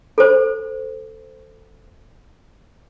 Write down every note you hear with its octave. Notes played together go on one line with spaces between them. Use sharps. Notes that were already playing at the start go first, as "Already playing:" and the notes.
A4 C5